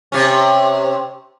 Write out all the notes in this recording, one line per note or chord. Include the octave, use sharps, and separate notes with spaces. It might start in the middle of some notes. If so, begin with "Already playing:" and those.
C3 C#4